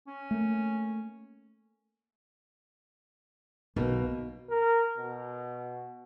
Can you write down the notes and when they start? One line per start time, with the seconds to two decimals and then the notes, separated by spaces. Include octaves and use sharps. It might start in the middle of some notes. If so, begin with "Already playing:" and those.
0.07 C#4
0.31 A3 A#3
3.76 B1 B2 A#3 D#4
4.50 A#4
4.98 B2